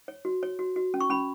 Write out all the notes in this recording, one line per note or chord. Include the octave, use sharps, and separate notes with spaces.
C#5
F#4
C#5
F#4
F#4
C#4
C#6
C#4 B5